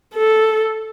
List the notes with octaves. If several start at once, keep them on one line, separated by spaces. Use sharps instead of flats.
A4